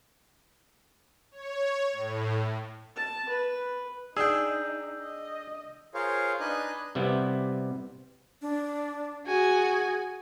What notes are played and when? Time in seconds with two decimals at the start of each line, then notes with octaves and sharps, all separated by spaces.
1.32 C#5
1.93 A2
2.96 A5
3.29 B4
4.17 D4 D#4 G#4 G5 E6 G6
5.01 D#5
5.94 F4 G#4 A#4 C5 C#5 F5
6.40 D4 D#4 B4 D#5 G#5 F#6
6.95 C3 G3 B3 E4
8.42 D4
9.27 F#4 G#4 G#5